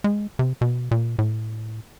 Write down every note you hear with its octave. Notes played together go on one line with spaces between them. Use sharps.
G#3
C3
B2
A#2
A2